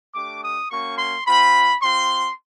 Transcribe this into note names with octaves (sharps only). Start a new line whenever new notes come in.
A3 D4 G4 D6
D#6
A#3 C#4 F#4 C#6
C6
C4 F4 B5
C4 F4 C6